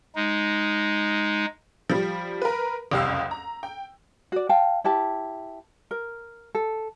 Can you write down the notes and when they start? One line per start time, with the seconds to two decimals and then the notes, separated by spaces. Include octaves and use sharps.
0.15 G#3 D#4
1.90 F3 G3
2.42 A#4 B4
2.91 F#1 C2 F2 G4 F5 E6
3.31 A#5
3.63 G5
4.32 F#4 D5
4.49 F5 G5 A5
4.84 E4 G4 A5
5.91 A#4
6.55 A4